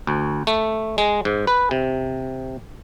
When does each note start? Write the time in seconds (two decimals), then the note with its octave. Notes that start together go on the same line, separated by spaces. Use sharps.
0.07 D2
0.47 A3
0.98 G#3
1.25 G#2
1.47 B4
1.71 C3